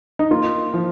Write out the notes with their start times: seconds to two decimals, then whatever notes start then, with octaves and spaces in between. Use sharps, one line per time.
0.19 D#4
0.31 A#3 F4
0.74 F3